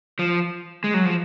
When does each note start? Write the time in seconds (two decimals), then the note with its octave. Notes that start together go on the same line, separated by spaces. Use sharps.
0.19 F3
0.84 G#3
0.94 F#3
1.05 F3